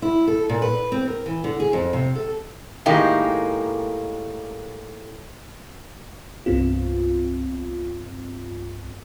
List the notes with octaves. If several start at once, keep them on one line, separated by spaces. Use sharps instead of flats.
E4
A4
A#2
B4
C4
A#4
E3
D3
G#4
F2
C3
A4
A2 D#3 G#3 A#3 D#4 G4
C2 G2 B3 C4 F4